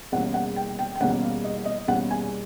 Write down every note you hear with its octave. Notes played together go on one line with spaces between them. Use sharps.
E2 B2 G3 A#3 C#4 F#5
F#5
G5
G5
G5
E2 B2 G3 A#3 C#4 F#5
F5
D#5
D#5
E2 B2 G3 A#3 C#4 F#5
G#5